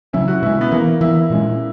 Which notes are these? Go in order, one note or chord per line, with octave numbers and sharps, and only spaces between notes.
C#3 F#3 C#4 E4
F#4
B2 G#3 C#4 E4
B3
E3 A#3 B3
E3 B3 E4
A#2 G#3 C#4